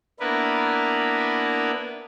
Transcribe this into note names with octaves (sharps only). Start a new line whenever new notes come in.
A#3 B3 D4 E4 A#4 B4